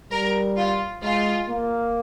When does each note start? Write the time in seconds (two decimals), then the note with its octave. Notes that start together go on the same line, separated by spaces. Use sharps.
0.11 G3 A#4
0.57 F4
1.03 G#3 F4
1.49 A#3